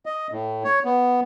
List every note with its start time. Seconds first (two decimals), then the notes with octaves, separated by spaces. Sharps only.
0.06 D#5
0.32 A2
0.64 C#5
0.85 B3